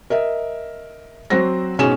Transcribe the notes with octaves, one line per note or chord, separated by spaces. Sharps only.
A#4 D#5 E5
F#3 C4 F#4 C5 A#6
G#2 B2 C#4 G#4 G#5 E7